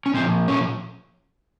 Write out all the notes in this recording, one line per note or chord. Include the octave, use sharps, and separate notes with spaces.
C#4
A#2 F3 C4
C#4